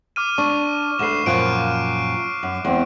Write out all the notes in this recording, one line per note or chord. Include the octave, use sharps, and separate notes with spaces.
D6 F6 D#7
D4 C#6
D2 D3 B4 C7 E7
F#2 A#2 F3 C#6 F#6 D7
F#2
E2 C4